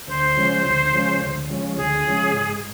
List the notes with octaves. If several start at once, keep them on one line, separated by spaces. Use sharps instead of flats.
D2 C5
C#3 F3 G#3 C#4
D2
C#3 F3 G#3 C#4
D2
C#3 F3 G#3 C#4
D2 G#4
C#3 F3 G#3 C#4
G#2